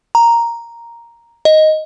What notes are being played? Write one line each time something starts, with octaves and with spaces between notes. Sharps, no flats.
A#5
D#5